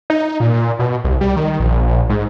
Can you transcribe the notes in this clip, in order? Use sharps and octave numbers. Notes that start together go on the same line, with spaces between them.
D#4
A#2
A#2
B2
C2
G3
D#3
A#1
A#1
G#2